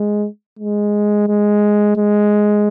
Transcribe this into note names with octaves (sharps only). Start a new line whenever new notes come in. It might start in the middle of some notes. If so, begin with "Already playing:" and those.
Already playing: G#3
G#3
G#3
G#3